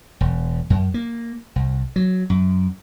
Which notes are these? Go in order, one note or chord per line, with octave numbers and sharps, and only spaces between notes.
E1
F#2
A#3
C2
F#3
F#2